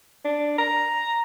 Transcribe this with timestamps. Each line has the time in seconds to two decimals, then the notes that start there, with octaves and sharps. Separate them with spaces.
0.25 D4
0.58 A#5